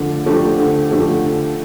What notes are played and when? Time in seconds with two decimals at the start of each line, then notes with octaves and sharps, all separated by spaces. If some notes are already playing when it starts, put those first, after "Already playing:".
Already playing: D3 F3 A3 D4
0.26 F3 A3 D4 G4
0.58 D3
0.91 F3 A3 D4 G4
1.25 D3